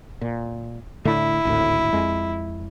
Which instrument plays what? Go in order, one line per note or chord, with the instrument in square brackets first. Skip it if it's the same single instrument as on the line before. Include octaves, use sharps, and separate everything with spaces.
[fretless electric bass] A#2
[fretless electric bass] A2 D3 A3 [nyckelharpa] E4
[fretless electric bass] G#1 D2 A2
F2 G#3